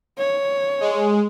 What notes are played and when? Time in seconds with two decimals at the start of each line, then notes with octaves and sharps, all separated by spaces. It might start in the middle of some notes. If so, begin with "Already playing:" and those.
0.18 C#5
0.81 G#3